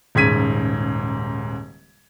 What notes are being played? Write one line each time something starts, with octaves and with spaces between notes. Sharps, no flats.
D#1 G#2 C#3 G#6 B6 D#7